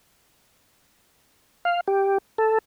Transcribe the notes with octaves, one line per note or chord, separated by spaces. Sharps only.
F5
G4
A4